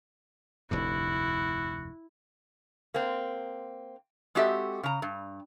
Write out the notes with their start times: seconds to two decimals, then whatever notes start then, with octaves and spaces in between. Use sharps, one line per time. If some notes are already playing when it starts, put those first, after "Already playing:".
0.71 F1 D2 G2 E4 F#4
2.94 A#3 C4
4.35 G#3 C4 F#4 G4 A4 E5
4.83 C#3 A#5
5.02 G2